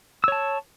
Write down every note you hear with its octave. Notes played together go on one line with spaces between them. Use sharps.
C#5 A5 E6